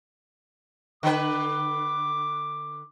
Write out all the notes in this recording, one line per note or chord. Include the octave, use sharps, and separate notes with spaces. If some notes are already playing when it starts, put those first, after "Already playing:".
D3 B4 D6